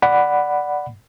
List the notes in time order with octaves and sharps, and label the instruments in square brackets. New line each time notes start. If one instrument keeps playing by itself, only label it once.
[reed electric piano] D5 F#5 B5